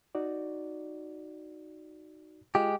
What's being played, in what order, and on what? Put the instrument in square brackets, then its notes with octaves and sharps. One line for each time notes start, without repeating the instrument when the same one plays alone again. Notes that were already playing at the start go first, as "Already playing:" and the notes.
[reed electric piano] D#4 F#4 D5
[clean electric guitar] G#3 G4 [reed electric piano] F4